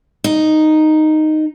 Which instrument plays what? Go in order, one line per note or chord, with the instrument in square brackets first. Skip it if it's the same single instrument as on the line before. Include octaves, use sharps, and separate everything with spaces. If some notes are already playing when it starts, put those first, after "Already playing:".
[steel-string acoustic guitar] D#4